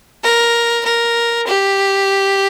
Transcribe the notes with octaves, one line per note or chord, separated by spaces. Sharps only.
A#4
A#4
G4